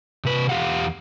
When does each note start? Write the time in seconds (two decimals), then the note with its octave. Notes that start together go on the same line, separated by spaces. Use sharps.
0.25 C3 B4
0.49 E2 G4 F5 F#5